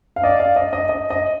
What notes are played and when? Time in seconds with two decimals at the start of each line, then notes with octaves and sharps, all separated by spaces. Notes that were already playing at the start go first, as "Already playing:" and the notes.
0.16 F5
0.23 D5 D#5
0.40 F5
0.56 D#5
0.73 D#5
0.89 D#5
1.10 D#5